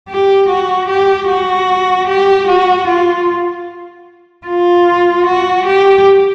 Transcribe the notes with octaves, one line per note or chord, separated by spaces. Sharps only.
G4
F#4
G4
F#4
G4
F#4
F4
F4
F#4
G4